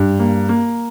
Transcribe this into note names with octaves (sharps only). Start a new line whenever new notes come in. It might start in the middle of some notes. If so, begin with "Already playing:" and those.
Already playing: G2
A#3
A#3